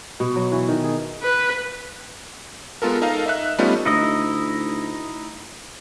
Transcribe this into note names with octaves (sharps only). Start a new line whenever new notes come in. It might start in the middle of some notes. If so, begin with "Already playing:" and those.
B2
F#3
E3
D#3
G#4
B4
G#3 B3 F4 A4 A#4
D#4 A4 A#4 D#5 F5
D#4 E5 F#6
G3 A3 B3 C#4 D#4 F4
D2 D#4 E4 D#5